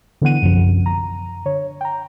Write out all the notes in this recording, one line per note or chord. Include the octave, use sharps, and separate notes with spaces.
D3 E3 B3 F#5 D#7
B1 F#2 C3 F3
A#5
D3 C#5
G5 A#5